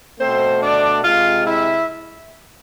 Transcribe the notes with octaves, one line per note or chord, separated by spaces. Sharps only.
B2 A3 C4 C5
D4 D5
C3 G#3 F4 F5
E4 E5